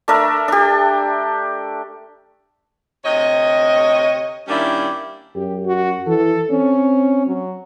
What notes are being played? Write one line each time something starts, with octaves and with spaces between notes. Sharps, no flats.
A3 D4 A#4 E5
D4 G4
D2 C3 C#5 D#5
D#3 G3 A#3 C#4 D4 E4
F#2 G4
F#4
E3 A4
C4 C#4
F#3